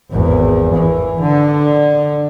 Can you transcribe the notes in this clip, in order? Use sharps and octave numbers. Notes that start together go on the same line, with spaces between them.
G#1 E2
E3
D3